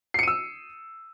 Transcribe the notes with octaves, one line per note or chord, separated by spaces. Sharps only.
E6 C7 C#7 D#7